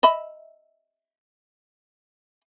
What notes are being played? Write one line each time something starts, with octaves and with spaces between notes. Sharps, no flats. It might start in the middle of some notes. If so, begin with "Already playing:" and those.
D#5 E5 B5